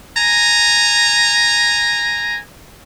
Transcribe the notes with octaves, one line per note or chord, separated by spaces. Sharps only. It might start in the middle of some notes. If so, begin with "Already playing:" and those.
G#5 A#5